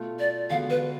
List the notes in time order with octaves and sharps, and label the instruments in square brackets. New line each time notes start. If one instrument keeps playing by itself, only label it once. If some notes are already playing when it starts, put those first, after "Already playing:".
Already playing: [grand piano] B2 A3 F4
[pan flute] D5
[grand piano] D3 G#3 B3 F#4 [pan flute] F5
[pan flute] B4